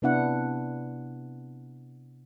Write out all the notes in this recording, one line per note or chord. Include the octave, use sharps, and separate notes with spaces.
C3 B3 D4 E4 F#5